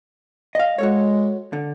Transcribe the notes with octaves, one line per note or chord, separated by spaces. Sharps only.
D#5 F5
G#3 F#4 A4 C#5
D3